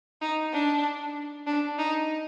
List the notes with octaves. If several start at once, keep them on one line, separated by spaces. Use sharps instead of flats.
D#4
D4
D4
D#4